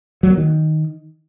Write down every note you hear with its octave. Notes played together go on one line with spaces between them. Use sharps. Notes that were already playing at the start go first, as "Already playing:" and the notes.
F#3
A#3
D#3